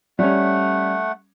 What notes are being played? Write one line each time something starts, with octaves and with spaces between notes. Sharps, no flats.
G3 A3 C#4 F#5